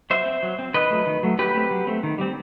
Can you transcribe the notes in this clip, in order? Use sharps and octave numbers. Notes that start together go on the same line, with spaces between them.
F#3 C5 E5
C4
F#3
C4
D#3 B4 D#5
F#3 A3
D#3
F#3 A3
F#3 G4 B4
A3 C4
F#3
A3 C4
D#3
G3 C4